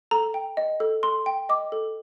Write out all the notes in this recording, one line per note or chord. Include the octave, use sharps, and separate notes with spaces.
A4 A#5
G5
D#5
A4
A4 C6
G5
D#5 D6
A4